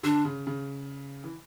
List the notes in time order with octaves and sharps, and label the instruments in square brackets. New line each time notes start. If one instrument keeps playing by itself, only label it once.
[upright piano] D3 [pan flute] D4
[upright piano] C#3
C#3
E3